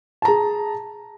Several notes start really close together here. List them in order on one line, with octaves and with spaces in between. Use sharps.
A5 A#5 G#4